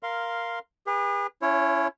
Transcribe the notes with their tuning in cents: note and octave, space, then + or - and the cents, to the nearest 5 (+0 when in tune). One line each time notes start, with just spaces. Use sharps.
A#4 +0 F5 -5 C6 +0
G#4 -45 B4 -25
C#4 +25 E4 +30 C#5 -15